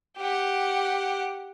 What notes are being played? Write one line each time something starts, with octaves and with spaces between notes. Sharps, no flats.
G4 F#5